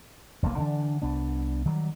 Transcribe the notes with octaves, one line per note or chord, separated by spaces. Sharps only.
F1 B1 B2 A#3
D3 E3 D4
C2 B3 D4
D#3 F#3 G3